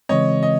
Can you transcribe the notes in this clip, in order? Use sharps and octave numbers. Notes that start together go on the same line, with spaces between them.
C#3 E3 G#3 C4 C#5 D#5
D#5